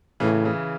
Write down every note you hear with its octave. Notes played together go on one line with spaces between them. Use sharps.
A2 C#3 E3
C#3 E3